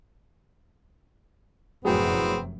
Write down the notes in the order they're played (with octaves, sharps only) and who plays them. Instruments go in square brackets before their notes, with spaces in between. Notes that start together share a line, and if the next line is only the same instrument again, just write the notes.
[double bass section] F1 F#2 [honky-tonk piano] A2 F#3 [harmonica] B3 C4 [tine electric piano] G#4 G5